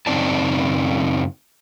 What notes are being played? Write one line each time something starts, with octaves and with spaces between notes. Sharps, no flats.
F#2 C#3 C4 D#4 D5 A5